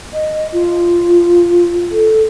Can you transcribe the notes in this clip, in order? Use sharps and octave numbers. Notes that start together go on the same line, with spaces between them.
D#5
F4
A4